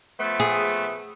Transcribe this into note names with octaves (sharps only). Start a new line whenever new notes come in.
F3 A3 B3
G#4